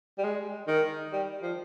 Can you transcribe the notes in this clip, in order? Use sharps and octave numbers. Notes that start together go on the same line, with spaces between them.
G3
G#3
D#3
G3
F3